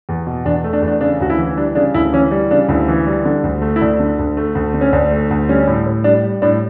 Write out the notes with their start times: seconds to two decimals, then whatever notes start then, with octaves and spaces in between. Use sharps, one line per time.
0.09 E2
0.27 B2
0.45 E2 D4
0.64 A3
0.73 D4
0.82 E2
0.88 D4
1.01 C#3 D4
1.21 D2 F#4
1.30 E4
1.38 E3
1.57 G3 D4
1.75 C#3 D4
1.94 D2 E4
2.13 E3 C#4
2.31 G3
2.51 C#3 D4
2.69 D2 E4
2.88 E3
3.07 G3
3.25 D3
3.44 D2
3.62 A3
3.76 E4
3.81 D2 D4
3.99 D3
4.19 D2
4.37 A3
4.55 D2
4.74 D3
4.81 C#4
4.93 D2 D4
5.11 A3
5.31 D2
5.49 G3 C#4
5.67 A2
5.86 A2
6.04 G3 D4
6.24 G3
6.42 A2 D4